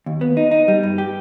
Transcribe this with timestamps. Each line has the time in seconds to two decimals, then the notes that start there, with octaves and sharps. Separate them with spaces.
0.06 D#2
0.21 B3
0.37 D#4
0.51 D#4
0.68 G3
0.83 G2
0.98 G4